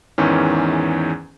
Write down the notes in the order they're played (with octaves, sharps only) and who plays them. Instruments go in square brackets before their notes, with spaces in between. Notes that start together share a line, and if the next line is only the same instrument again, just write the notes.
[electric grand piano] E2 G#2 D#3 E3 C#4